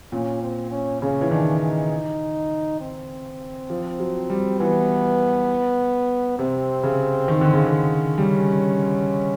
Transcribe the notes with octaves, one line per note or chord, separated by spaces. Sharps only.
A#2 C#4
C4
C#4
C#3 C#4
E3
D#3 D4
D#4
C4
F3
F#3
G3
E3 B3
C3 C4
C#3
D#3
D3
C#3
D3
G3 C#4